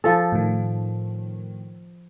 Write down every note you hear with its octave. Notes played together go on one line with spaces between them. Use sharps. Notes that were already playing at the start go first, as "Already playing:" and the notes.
F3 A4
A2 D#3